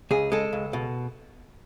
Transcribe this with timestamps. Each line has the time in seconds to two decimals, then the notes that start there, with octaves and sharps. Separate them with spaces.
0.11 C#2 G#4
0.32 G#3 A4
0.53 C#2
0.73 B2